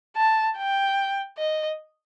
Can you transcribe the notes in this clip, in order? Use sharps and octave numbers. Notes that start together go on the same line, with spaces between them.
A5
G5
D#5